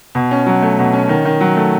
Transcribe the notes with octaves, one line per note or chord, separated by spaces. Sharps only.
B2
C#4
F#3
A3
B2
C#4
D#3
D#3
F#3
A3